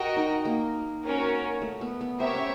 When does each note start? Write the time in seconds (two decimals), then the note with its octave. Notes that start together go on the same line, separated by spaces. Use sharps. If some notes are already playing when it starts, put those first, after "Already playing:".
Already playing: F#4 A#4 D#5 G5
0.16 D#4
0.45 A#3
1.04 C#4 F#4 A#4
1.62 A3
1.81 B3
2.01 B3
2.20 C4 G4 A#4 C#5 E5
2.35 C#4